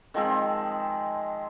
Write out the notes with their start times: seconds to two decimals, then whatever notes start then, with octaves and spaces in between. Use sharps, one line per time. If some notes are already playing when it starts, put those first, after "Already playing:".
0.14 D#3 F3 G#3 C4